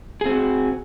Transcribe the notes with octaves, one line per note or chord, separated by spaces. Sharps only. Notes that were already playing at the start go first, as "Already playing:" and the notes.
C4 F#4 G#4